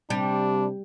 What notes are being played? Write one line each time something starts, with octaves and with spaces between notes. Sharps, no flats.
C3 G3 D4